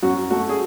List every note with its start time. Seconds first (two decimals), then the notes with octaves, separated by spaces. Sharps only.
0.03 F#2 F#4
0.31 A3 F#4
0.49 G#4